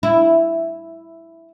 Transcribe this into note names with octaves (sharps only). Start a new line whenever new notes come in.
E4